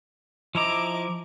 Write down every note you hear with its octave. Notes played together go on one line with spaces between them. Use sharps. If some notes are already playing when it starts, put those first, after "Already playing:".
F3 E4 D#5 A#5 D6